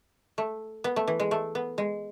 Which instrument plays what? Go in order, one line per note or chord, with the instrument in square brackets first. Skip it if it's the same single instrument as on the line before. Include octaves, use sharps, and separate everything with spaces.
[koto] A3
B3
A3
E3
G#3
A3
B3
G#3